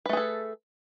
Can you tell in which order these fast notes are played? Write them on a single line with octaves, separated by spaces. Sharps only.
B4 A3 G#4 A4